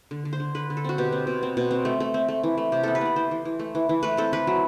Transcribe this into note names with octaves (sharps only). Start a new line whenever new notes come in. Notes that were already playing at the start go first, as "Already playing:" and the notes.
D3
D3
C5
D3
D3 B4
D3
A4
C4 F#4
B2 G4
C4
B2
C4
B2
C4
A3
A3
C4
A3
E3
A3
C3 G4
B3 A4
B4
B3 D5
E3 C5
E3
E3
A3
E3
E3
A3 B4
C4 A4
E3 B4
F#3